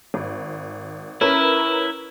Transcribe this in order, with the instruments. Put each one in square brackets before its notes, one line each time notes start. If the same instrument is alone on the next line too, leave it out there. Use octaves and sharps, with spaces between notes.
[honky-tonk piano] G#1
[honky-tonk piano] C#4 A#4 B4 [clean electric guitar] E4